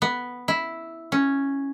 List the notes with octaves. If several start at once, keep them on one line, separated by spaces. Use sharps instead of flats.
B3
E4
C#4